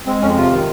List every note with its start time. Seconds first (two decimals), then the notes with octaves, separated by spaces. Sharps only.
0.06 G#3 C4
0.22 F2 C#4
0.37 C3 F4
0.52 D#3